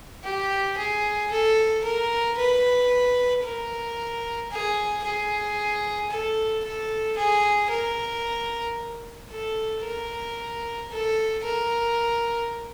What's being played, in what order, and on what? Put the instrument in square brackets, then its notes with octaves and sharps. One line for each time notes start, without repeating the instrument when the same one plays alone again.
[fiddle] G4
G#4
A4
A#4
B4
A#4
G#4
G#4
A4
A4
G#4
A#4
A4
A#4
A4
A#4